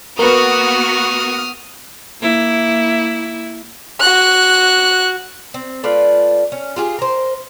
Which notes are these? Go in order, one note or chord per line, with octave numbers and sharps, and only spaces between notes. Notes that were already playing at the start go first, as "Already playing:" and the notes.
A#3 B3 F#4 A#4 B4 D#6 F6
A#3 E4
F#4 F#6
C4
A3 F4 B4 D5
C#4
F4 G4 G#4
A#4 C5